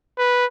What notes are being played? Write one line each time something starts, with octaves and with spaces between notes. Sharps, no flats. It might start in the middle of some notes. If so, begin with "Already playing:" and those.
B4